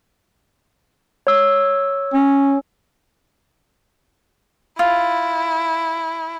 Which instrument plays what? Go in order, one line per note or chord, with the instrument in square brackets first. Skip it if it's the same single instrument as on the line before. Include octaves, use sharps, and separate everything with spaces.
[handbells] C#5 E6
[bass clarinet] C#4
[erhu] E4 [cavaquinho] F4